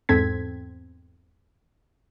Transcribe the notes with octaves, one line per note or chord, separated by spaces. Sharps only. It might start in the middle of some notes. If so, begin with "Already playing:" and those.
E2 G#2 C4 A4 G#6 B6